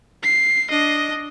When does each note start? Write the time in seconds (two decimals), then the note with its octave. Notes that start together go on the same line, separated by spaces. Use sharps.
0.23 C7
0.70 D4 D#5